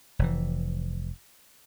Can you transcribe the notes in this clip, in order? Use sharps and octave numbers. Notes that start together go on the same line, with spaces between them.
F1 E3